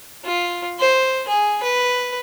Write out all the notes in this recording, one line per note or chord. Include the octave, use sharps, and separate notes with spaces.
F4
C5
G#4
B4